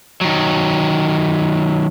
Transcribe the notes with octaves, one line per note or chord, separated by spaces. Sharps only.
D#3 F#3